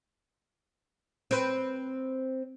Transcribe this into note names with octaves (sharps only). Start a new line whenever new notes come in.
C4 B4